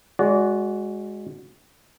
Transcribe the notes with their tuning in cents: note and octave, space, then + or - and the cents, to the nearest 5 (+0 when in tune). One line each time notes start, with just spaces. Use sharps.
G#3 +0 F#4 +0 D5 -30